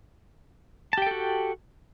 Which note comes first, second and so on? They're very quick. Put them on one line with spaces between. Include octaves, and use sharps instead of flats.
A5 G4 G5 A4 F#4